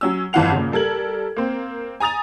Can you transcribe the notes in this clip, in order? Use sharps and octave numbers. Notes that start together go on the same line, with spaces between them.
F#3 C#4 E6
G1 F2 E3 F5 F#5 F7
A#2 C#3
G3 A4 A#4 G#6 F#7
A#3 C4
G#5 A#5 D#6 A6 F7